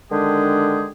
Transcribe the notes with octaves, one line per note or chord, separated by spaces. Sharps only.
D3 D#3 G#3 D4 G4 G#4